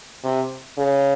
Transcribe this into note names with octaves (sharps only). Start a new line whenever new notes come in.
C3
C#3